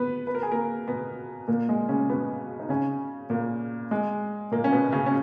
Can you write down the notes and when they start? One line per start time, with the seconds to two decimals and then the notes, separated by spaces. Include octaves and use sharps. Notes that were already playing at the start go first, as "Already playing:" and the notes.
Already playing: B3 B4
0.27 B4
0.35 A#4
0.43 G#4
0.52 A#3 A#4
0.88 B2 B3
1.48 A#2 A#3
1.69 G#3
1.89 C#3 C#4
2.09 B2 B3
2.60 D#4
2.69 C#3 C#4
3.30 A#2 A#3
3.91 G#3
4.52 A#2 A#3
4.64 C#4
4.72 B2 B3
4.92 C#3 C#4
5.06 C#4